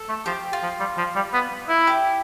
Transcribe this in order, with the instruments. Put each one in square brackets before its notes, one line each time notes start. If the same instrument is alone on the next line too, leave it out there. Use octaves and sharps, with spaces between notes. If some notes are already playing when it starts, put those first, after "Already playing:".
Already playing: [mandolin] A4
[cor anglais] A3
[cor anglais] F3 [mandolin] G4
[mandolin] F4
[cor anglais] F3
G3
F3
G3
B3
E4
[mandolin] G4